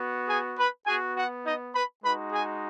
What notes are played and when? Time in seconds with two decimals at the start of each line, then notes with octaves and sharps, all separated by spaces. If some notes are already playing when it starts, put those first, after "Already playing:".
Already playing: B3 F#4
0.28 G#4 G#5
0.58 B4 B5
0.86 B3 F#4 G#4 G#5
1.16 F#4 F#5
1.44 D#4 D#5
1.73 B4 B5
2.02 G#3 D#4 F#4 B4 B5
2.32 G#4 G#5